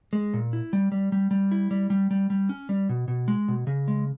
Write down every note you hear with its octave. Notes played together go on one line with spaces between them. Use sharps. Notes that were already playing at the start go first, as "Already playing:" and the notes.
G#3
A#2
E4
G3
G3
G3
G3
E4
G3
G3
G3
G3
C#4
G3
B2
B2
G#3
B2
C#3
G#3